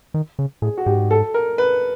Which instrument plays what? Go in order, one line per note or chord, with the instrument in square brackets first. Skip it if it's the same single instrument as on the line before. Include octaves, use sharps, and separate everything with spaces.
[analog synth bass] D#3
C#3
[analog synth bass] A2 [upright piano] G#4
[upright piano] F#4
[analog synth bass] G#2 [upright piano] G4
[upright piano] A4
A#4
B4